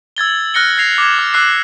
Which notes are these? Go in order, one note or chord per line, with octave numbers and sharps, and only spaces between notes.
E6 G#6 A6 G7
F6 F#6 A#6 C#7 G7
G#6 A#6 C7 F7
D6 G#6
F6
D6 E6 F#6 C7